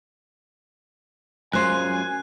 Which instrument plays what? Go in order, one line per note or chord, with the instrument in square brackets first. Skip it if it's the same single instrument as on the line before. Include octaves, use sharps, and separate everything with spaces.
[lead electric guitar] F#2 F4 [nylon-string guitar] G#3 C5 [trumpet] G#5 [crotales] F#6